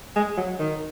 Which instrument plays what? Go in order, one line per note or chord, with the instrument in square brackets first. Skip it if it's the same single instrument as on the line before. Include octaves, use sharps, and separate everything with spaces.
[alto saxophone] G#3
F#3
D#3